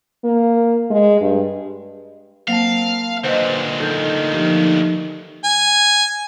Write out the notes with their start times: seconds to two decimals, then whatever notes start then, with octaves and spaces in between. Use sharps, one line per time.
0.24 A#3
0.90 G#3
1.21 G2
2.48 F#3 A#3 C4 F5 A5
3.24 D2 A#2 B4 C5 D#5 F#5
3.80 D#3 F#3 A4 G6
4.33 F3 D#4 G4
5.44 G#5